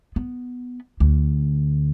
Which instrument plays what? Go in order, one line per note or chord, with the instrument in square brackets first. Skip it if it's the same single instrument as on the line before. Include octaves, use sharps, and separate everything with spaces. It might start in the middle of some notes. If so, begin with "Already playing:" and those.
[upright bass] B3
D2